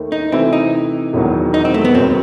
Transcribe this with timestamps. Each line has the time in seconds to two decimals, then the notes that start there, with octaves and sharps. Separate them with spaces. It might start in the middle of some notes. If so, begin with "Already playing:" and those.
Already playing: D#2 D#3 A3
0.12 D#4
0.32 C3 E3 A3 C4 E4
0.53 D#4
1.13 E1 E2 D#3 F#3
1.54 D#4
1.65 C4
1.74 A3
1.85 B3
1.94 E1 D#2 D#3 F#3 C4